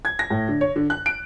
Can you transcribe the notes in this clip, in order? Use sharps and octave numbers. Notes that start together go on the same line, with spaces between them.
G#6
A#6
A2
D3
C#5
D3
F#6
D7